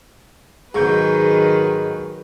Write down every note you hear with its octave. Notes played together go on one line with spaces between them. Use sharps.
G#2 D#3 F#3 G#4 B4 C#6 G6